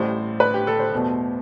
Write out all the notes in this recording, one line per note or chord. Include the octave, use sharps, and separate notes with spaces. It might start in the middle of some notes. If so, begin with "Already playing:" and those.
Already playing: A1 A2 G3 C5
B4
G4
A4
C5
E2 B2 A3